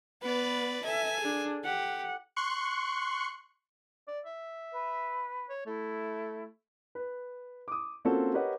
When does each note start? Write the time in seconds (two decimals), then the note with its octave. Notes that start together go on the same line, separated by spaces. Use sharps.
0.22 B3 B4 D5
0.84 A4 E5 G#5
1.21 D4 G#4
1.64 G4 F#5
2.36 C6 C#6 F#6 C#7
4.08 D5
4.25 E5
4.72 B4
5.50 C#5
5.66 A3 E4
6.95 B4
7.68 D6 D#6
8.05 A#3 C4 C#4 F4 F#4 A4
8.34 G4 A#4 B4 C#5 D#5 F#5